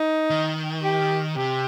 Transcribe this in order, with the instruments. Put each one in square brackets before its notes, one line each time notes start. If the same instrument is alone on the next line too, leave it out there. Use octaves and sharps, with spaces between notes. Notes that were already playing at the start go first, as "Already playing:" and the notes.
Already playing: [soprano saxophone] D#4
[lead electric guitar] D#3
[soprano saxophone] G4
[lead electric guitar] C3 [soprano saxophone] G4